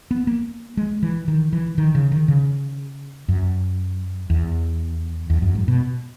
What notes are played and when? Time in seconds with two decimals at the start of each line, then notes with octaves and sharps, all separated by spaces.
0.11 B3
0.27 A#3
0.77 G#3
1.03 E3
1.28 D#3
1.53 E3
1.78 D#3
1.95 C#3
2.12 D#3
2.28 C#3
3.28 F#2
4.30 E2
5.30 E2
5.42 F#2
5.55 G#2
5.68 B2